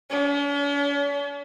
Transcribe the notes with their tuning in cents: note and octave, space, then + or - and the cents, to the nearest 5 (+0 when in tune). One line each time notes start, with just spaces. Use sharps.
C#4 +45